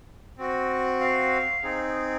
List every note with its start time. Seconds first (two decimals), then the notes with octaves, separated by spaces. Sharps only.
0.38 C4 F#4
1.01 F5
1.63 C4 D#4 G#4